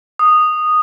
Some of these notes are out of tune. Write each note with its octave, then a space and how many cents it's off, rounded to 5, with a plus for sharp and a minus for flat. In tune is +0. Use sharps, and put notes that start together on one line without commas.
D#6 -10